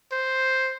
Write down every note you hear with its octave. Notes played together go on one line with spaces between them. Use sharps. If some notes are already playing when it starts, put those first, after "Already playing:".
C5